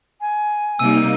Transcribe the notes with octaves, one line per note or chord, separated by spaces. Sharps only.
G#5
C3 G3 A#3 D#4 E6 D#7